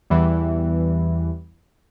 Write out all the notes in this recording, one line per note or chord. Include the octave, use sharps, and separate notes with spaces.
E2 E3 G3